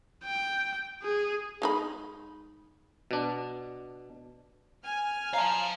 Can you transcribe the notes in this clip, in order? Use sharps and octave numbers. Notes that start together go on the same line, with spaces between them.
G5
G#4
G#3 D#4 B5
B2 D4
G#5 F6
F5 A5 A#5